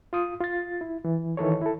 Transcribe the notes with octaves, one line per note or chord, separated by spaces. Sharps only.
F4 D#6
F4 A6
E4
E3
D#3 E3 A4 C#5
E4 A4